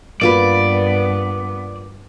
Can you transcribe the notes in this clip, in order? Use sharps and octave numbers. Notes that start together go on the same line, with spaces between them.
G2 A#3 B3 F4 B4 D5